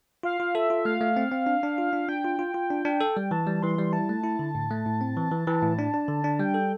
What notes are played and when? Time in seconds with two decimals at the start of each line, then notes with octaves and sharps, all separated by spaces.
0.23 F4 F5
0.40 F4
0.55 A4 E5
0.70 F4
0.85 A3 F5
1.01 A3
1.17 C4
1.32 C4
1.47 D4
1.63 D4
1.78 F4
1.93 D4
2.09 D4 G5
2.24 F4
2.39 F4
2.54 F4
2.71 D4
2.85 D4
3.01 A4
3.17 G3
3.31 E3 A5
3.47 G3
3.63 E3 C6
3.78 G3
3.93 E4 A5
4.09 A3
4.24 E4
4.39 D3
4.55 A2
4.71 A3
4.86 A2
5.01 C4
5.17 E3
5.31 E3
5.47 E3
5.62 A2
5.79 D4
5.94 D4
6.08 D3
6.24 D4
6.39 G3 G5
6.54 A4